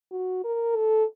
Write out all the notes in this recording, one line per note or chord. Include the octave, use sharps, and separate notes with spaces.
F#4
A#4
A4